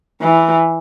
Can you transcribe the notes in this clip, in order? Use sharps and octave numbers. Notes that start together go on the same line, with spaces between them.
E3